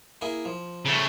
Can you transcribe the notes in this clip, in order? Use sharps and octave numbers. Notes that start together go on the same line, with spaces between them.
A#3 E4 G#4
F3
C#3 A3